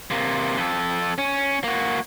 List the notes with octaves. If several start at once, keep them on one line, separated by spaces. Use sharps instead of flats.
C3 A#3
F2 A4
C#4
A#3 F#4